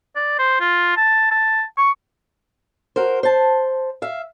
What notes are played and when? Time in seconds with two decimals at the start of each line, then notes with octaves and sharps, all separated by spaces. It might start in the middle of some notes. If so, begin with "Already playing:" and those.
0.16 D5
0.39 C5
0.61 F4
0.97 A5
1.31 A5
1.78 C#6
2.96 F#4 A#4 C5
3.23 C5 A5
4.02 E5 F5